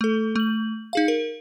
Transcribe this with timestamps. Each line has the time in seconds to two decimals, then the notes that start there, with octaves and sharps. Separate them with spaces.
0.01 A3 A4
0.36 A3 F#7
0.93 D#4 G#4 F5
1.08 A#4